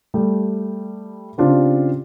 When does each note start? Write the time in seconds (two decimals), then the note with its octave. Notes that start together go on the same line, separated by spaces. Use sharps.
0.14 G3 A3
1.38 C#3 C4 D4 F4 G4